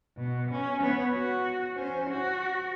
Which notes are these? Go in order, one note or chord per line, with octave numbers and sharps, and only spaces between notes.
B2
C#4
B3 C#5
F#4
C#4 C5
F#4